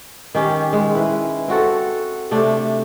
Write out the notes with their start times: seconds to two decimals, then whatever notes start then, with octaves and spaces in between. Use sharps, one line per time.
0.35 D#3 C#4 G4
0.73 G#3
0.95 E4 B4
1.48 C4 F#4 A4
2.31 C3 A3 D4